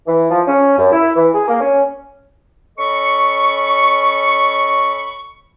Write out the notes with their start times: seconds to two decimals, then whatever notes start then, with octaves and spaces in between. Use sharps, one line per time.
0.07 E3
0.30 F3
0.47 C#4
0.78 F#2
0.92 E4
1.15 E3
1.34 G#4
1.48 A#3
1.60 C#4
2.78 C#4 A4 D#5 B5 C#6